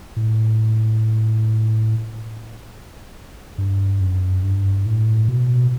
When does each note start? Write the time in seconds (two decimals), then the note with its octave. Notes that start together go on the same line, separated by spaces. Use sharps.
0.16 A2
3.58 G2
4.00 F#2
4.43 G2
4.86 A2
5.28 B2